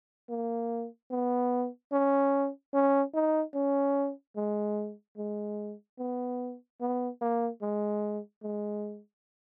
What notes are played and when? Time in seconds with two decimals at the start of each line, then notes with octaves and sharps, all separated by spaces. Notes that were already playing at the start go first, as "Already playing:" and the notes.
0.30 A#3
1.11 B3
1.92 C#4
2.74 C#4
3.14 D#4
3.55 C#4
4.37 G#3
5.18 G#3
5.99 B3
6.81 B3
7.21 A#3
7.62 G#3
8.43 G#3